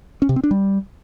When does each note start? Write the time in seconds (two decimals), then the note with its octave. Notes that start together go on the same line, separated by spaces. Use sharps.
0.22 C#4
0.29 C3
0.36 C4
0.44 D4
0.51 G3